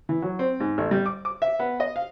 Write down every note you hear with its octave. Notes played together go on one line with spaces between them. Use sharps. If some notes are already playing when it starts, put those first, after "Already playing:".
E3
F#3
C4
G#2
A1
G3
D6
D6
E5
B3
D#5
F5